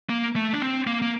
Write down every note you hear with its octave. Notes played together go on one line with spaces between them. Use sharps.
A#3
A3
D4
C4
A#3
A#3